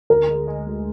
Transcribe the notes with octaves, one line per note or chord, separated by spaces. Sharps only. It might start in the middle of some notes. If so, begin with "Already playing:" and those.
D2 A#4
G#3
G#3
D2